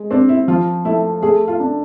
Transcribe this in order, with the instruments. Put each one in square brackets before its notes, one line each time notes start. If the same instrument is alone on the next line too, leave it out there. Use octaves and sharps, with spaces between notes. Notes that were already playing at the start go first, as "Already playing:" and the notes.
Already playing: [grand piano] G#3
[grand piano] C4 [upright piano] D4
[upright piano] E4
[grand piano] F3 [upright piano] F4
[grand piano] A3 [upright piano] E4
[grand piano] A3 [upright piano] G#4
[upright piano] F4
[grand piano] D4